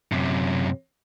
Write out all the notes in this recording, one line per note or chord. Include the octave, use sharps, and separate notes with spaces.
F#2 C3